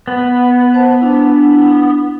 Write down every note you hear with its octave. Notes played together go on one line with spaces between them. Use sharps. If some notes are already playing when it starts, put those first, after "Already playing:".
B3
C5 F#5 A5
D4 E4